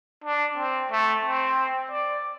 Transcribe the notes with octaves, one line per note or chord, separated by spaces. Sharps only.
D4
C4
A3
C4
D5